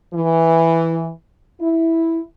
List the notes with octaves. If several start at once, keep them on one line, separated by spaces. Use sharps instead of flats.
E3
E4